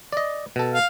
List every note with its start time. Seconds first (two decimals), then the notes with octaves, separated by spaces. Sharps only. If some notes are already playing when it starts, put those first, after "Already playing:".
0.13 D5 D#5
0.56 B2 A4
0.74 F5